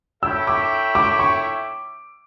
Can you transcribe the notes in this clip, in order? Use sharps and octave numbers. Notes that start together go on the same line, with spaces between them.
E4 A4 C#5 E5 G5 E6
D6
D6
C#6